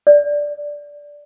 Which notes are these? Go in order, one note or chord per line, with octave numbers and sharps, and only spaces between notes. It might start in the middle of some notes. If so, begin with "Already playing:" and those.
D5